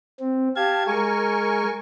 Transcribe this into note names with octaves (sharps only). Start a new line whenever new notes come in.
C4
G4 F5 A5 G#6
G#3 A#4 G#5 C#6